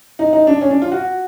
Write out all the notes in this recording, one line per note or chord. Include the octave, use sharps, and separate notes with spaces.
D#4
D#4
D4
C#4
D4
F4
F#4